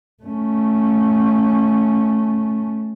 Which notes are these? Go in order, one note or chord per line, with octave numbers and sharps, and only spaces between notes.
A3 C#4